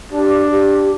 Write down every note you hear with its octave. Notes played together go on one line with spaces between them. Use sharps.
D4 G4
G4